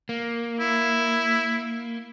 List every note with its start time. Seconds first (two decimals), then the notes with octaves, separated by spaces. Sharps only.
0.09 A#3
0.60 E4